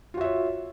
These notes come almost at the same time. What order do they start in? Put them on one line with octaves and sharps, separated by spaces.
F4 F#4 E5 C#5